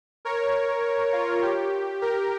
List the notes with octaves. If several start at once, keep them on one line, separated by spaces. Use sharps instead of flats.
A#4 C#5
F4
G4
G4 A#4